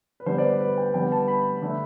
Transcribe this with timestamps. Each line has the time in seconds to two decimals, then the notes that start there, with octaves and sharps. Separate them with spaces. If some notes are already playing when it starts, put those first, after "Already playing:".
0.20 B4
0.26 D3 G3 B3 C5
0.38 D5
0.48 B4
0.60 B4
0.78 G5
0.94 D3 G3 B3 G5
1.12 A5
1.28 B5
1.62 D3 A3